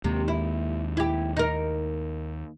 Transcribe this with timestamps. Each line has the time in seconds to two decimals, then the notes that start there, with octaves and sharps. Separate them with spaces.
0.04 D#2 C3 G#3 A#3
0.28 E4
0.97 E4 G4
1.37 D#4 A#4